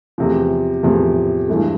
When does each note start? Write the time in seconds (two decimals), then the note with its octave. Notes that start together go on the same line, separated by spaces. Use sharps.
0.18 E2 C3 F3
0.83 E2 C3 F3
1.48 G2 E3 G#3